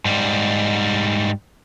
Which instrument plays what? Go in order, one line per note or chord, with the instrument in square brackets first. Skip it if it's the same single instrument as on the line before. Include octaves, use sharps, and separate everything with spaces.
[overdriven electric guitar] G#2 G3